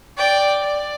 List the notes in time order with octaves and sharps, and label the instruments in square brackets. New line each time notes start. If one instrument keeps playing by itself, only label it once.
[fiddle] D5 [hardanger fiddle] G5
[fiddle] D5